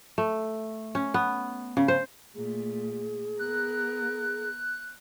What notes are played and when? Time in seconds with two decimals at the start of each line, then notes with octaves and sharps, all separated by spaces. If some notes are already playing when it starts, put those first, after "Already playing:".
0.18 A3
0.95 C#4
1.14 B3
1.77 C#3
1.88 C5
2.35 A#2 A3 G#4
3.39 B3 A#4 F#6